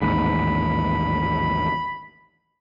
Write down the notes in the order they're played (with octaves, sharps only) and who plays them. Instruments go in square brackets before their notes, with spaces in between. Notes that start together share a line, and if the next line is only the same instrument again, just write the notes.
[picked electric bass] A1 D#2 G#2 [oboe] B5